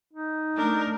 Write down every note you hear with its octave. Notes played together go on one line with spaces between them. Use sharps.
D#4
A3 D4 A#4